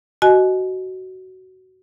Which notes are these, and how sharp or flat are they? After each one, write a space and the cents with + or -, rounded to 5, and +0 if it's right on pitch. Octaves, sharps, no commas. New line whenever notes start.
F#4 +15 D#5 +0 G#5 +35